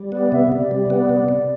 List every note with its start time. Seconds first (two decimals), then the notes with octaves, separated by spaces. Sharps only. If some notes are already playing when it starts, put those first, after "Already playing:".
Already playing: G3
0.12 B3 D5
0.32 C3 E5
0.51 C3 D5
0.71 G3
0.90 B3
1.09 C3
1.29 C3